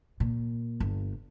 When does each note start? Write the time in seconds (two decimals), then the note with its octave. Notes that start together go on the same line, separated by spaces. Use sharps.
0.20 A#2
0.80 G1